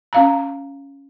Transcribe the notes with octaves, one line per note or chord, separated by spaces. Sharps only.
C#4 F5 A#5